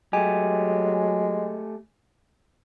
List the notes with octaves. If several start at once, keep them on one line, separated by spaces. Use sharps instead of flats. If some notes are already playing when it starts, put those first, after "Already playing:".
F#3 G#3 A3 G4 G#5